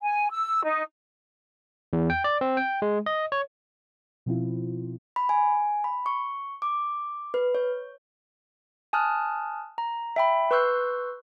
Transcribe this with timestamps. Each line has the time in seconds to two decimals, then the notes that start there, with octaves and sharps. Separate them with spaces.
0.02 G#5
0.30 E6
0.63 D#4
1.93 E2
2.10 G5
2.24 D5
2.41 C4
2.57 G5
2.82 G#3
3.06 D#5
3.32 C#5
4.26 B2 F3 C4 E4 F4
5.16 B5
5.29 G#5
5.84 B5
6.06 C#6
6.62 D6
7.34 B4
7.55 C#5
8.93 G#5 A5 D#6 F6 F#6
9.78 A#5
10.16 E5 G5 B5
10.51 B4 C6 C#6 E6 F#6 G6